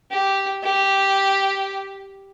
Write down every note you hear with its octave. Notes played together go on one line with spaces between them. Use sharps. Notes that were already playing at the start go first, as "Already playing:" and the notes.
G4
G4